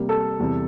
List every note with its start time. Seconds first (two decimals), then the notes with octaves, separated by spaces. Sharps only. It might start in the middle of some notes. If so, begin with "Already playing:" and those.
Already playing: C3 G3 A#3
0.09 A4
0.40 E2 C3 G3